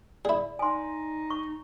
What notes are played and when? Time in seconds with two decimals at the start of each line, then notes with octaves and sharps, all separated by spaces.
0.25 E4 G#4 D5
0.59 D#4 G#5 C6
1.30 C#6